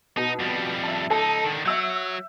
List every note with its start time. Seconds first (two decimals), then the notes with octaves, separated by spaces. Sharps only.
0.17 B2 D#4
0.39 F2 G3
0.84 E5 A5
1.10 C#2 D#4 A4
1.44 D3 D#3
1.65 F#3 E5 E6 G6